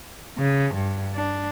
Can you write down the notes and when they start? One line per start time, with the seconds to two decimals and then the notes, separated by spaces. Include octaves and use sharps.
0.38 C#3
0.74 G2
1.14 D4